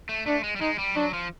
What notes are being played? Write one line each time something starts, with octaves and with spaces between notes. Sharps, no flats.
A3
A3 D4
G#3
G3
G#3 D#4
G3
F#3 D4
F3